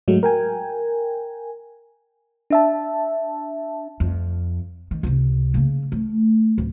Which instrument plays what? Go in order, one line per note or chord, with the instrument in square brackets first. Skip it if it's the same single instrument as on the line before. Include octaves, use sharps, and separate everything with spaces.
[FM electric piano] G#2 F#3 G#3 A3
A#4 G5 G#5
D4 E5 A5
[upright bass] F2
D#3
C#2 C3
C#3 A#3
A3
D1